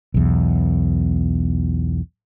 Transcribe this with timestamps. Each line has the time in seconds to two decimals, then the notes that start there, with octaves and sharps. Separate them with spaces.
0.14 B1 E2